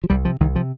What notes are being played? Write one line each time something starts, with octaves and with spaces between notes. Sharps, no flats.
F3
C2 G3
C3 F3
C2 D#3
C3 F3